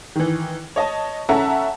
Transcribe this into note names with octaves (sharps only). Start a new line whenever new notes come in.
D#3 E3
C#5 D#5 A5
C#4 A4 E5 F#5 A5 A#5